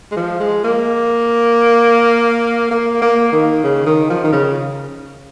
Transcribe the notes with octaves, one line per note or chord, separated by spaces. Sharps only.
G#3
F3
G#3
A#3
A#3
A#3
D#3
C#3
D#3
F3
D#3
C#3